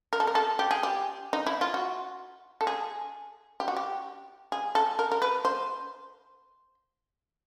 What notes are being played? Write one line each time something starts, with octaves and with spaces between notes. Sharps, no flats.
A#4
A4
A#4
A4
G4
G#4
G4
D#4
E4
F4
F#4
A4
G#4
G4
F#4
G4
G#4
A4
A#4
A#4
B4
C5